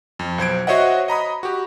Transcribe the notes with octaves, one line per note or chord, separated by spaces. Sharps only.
F2
B1 C5 G#6 D7
F#4 C5 C#5 D#5 E5 F#5
D#5 A#5 B5 D#6
F#4 G4